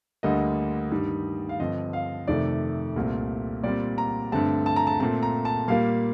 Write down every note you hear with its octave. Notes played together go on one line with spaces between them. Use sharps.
D2 D3 G3 A#3 D#5
G2 D#3 G3
F5
G2 D3 F3 C4 D#5
F5
F2 C3 D#3 A3 D5
C2 A#2 A3 C4
A#2 G3 C4 D5
A#5
G2 D3 A3 C4 A5
A5
A#5
A5
A#2 A3 C4 A5
A#5
A5
A#2 G3 A#3 F5